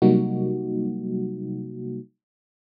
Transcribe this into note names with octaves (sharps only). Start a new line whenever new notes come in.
C3 F#3 G3 A#3 D#4 F#4